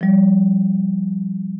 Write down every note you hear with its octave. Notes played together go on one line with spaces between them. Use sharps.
F3 G3